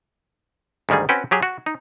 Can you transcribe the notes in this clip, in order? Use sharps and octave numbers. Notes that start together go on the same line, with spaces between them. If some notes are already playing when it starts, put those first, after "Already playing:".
D2 G#2 D#3 G3 G#4
C4 C#4 F#4 B4 G5
F#3 G4 G#4
F#4
D#4